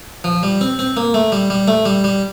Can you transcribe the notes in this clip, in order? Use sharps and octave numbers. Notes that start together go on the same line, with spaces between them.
F3
G3
C4
C4
A#3
A3
G3
G3
A3
G3
G3